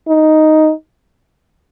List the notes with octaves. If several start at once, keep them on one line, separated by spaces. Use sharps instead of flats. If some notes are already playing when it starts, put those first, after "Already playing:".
D#4